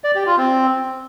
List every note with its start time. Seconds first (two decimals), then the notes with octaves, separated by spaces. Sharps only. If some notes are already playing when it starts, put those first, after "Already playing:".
0.04 D5
0.15 G4
0.26 F4
0.38 C4